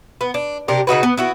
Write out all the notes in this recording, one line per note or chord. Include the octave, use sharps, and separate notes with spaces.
B3
D4
C3 D4 G4 A#4
C#3 D#4 F#4 B4
B3
B3 E4 F#4